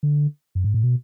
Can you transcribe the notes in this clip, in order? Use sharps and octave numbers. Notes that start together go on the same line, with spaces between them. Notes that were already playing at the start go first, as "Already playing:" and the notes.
D3
F#2
G#2
A2
B2